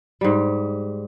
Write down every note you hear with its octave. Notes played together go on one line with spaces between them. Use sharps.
G#2 G3